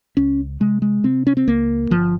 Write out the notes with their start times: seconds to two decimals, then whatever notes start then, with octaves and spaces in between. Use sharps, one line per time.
0.17 C#2 C#4
0.60 C3 G#3
0.82 G#3
1.04 C3 C4
1.27 C#4
1.37 C4
1.48 C#2 A#3
1.91 G1 F3